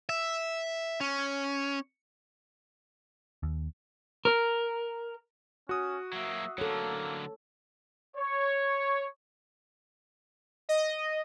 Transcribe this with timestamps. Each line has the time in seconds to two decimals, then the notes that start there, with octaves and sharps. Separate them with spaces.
0.09 E5
1.01 C#4
3.43 D#2
4.25 A#4
5.69 C#4 F#4 D#6
6.13 F#3 A#3 E5
6.58 D3 F#3 A#3 A4 C#5
8.17 C#5
10.69 D#5